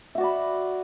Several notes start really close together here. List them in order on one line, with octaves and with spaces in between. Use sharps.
E5 F#4 D5 B5